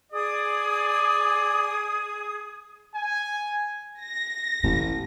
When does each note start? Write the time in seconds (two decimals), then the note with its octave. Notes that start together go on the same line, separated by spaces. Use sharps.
0.12 G#4 D5 D#6
2.95 G#5
4.01 A#6
4.63 A1 A#2